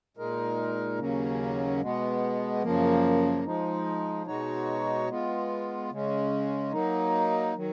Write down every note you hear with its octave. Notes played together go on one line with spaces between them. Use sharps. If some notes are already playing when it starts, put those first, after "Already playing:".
A#2 G#3 D#4 A#4
D#2 C#3 F#3 A#3 C#4
B2 G#3 B3
F#2 C#3 F3 A#3
F3 G#3 D#4
B2 G#3 D#4 F#4 C#5
G#3 B3 F4
C#3 G#3 C#4
F#3 A#3 D#4
D#3 F#3